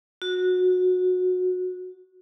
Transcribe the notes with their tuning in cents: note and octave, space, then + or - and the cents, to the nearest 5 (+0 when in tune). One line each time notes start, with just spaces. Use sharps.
F#4 -20